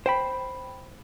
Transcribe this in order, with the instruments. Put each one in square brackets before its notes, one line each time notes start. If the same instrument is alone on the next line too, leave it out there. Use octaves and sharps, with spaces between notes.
[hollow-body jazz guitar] C5 G5 B5